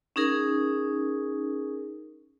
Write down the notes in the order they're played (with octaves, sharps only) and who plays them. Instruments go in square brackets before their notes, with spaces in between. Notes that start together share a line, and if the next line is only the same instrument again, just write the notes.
[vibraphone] C#4 D#4 G#4 A#4